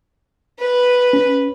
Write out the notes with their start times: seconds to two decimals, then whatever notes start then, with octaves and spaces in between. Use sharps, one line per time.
0.59 B4
1.13 C#4